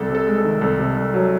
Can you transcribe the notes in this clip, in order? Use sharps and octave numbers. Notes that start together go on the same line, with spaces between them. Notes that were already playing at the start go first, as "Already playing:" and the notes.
Already playing: C2 A4
C3
A4
G#3
A4
D#3
C2 A4
C3
C2
F#3